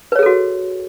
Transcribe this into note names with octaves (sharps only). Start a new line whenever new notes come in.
F#4 G#4 A4 B4 C#5